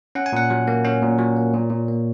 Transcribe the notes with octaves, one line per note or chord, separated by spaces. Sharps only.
C#4 F#5
G#5
A#2 F#5
F#3
A#3
C#4
A#2
F#3 C#5
A#3
A#2
A#2
A#3